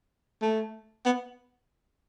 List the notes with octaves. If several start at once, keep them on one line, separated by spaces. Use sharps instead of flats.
A3
B3